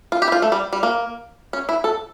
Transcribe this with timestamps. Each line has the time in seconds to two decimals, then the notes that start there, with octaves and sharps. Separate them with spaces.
0.12 F4
0.22 G4
0.28 E4
0.32 F4
0.42 A3
0.52 G3
0.73 G3
0.83 A#3
1.53 C#4
1.69 E4
1.84 A4